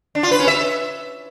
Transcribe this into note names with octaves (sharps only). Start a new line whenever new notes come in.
D4
F4
B4
C#4
E5